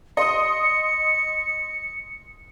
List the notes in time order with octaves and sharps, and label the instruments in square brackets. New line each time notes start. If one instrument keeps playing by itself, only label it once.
[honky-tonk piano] D#5 C6 D#6 [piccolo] C#7